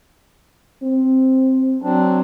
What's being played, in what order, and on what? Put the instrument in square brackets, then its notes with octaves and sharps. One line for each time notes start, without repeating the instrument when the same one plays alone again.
[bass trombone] C4
[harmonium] F#3 C4 D4